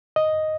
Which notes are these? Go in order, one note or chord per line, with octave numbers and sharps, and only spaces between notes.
D#5